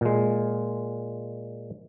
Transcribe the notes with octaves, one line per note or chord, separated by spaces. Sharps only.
A#2 G#3